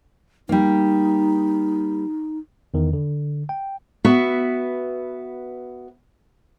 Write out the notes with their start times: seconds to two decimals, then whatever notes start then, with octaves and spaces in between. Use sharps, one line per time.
0.49 G3 A#3 D#4
2.74 E2 D#3
2.93 D3
3.49 G5
4.05 B3 F#4 B4 E5